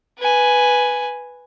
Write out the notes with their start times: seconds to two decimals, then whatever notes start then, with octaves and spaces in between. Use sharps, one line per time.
0.19 B4 G#5